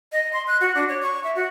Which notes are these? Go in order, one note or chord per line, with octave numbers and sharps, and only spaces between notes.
D#5
C6
F#6
F#4
D4
C#5
C#6
E5
F#4